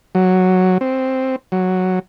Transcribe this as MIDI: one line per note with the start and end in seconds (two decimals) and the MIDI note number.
0.15 0.78 54
0.81 1.36 60
1.52 1.99 54